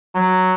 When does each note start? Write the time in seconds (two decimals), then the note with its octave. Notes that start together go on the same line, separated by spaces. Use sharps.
0.15 F#3